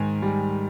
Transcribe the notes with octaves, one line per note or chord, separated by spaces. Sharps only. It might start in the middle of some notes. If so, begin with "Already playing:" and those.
Already playing: G#2 D#3 G#5
G3